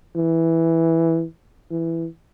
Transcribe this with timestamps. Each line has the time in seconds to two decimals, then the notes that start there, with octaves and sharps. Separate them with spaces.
0.16 E3
1.71 E3